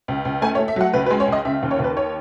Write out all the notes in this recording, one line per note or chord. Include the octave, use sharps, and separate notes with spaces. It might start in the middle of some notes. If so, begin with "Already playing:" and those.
C#2
C#2
A3 G#5
C#5
A3
E5
F#3 F#5
C#2 B4
B4
G#3
C#5
C#2 D#5
C#3 E5
D#2
C#5
D#2 B4
C#5